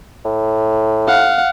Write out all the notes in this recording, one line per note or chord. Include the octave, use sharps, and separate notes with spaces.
A2
F5 F#5